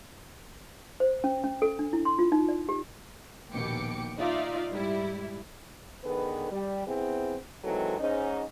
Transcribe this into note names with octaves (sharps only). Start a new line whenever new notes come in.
C5
C#4
C#4
A4
D4
E4
C6
F4
D#4
D5
G4
A#1 D#2 B2 G5 D6 C#7
D#4 F4 D5 E5 F5
G#2 G3 E4
D3 D#3 B3 G#4 B4
G3
B3 C4 E4 G#4
D#3 E3 F#3 G#3 C4 A4
G#2 C#4 D#4